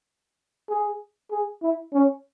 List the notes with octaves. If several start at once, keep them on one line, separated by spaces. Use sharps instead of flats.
G#4
G#4
E4
C#4